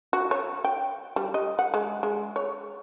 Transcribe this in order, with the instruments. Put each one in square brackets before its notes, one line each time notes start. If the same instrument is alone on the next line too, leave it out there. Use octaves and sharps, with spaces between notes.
[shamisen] F#4
C#5
G5
G3
D#5
F#5
G#3
G#3
C#5